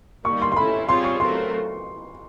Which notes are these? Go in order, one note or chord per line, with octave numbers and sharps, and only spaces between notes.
D#3 G3 A#3 C#6
C6
C6
A3 C#4 E4 A4 B5
G3 C4 F4 G#4 C#5 C6
C#6
F#3 A3 C4 F4 A#4 C6